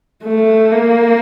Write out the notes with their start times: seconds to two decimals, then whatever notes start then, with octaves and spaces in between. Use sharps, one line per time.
0.24 A3
0.72 A#3